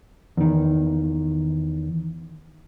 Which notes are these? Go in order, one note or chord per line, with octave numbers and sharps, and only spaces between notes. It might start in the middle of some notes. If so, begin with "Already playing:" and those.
E2 D#3